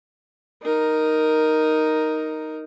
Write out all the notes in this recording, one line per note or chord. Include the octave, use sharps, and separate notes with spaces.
D#4 A#4